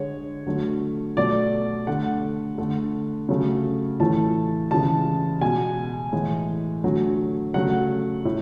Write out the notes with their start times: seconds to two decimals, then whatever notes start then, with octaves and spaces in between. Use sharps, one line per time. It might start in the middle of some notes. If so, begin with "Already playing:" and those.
Already playing: D3 G#3 C#5
0.46 D3 F#3 A3
1.17 B2 F#3 A3 D5
1.87 D3 A3 F#5
2.58 D3 A3
3.29 C#3 F#3 A3
4.00 A2 E3 A3 A5
4.71 C#3 E3 G#3 A5
5.41 B2 G#3 G#5
6.13 A2 E3 G#3
6.84 D3 F#3 A3
7.54 C#3 F#3 A3 F#5
8.25 A2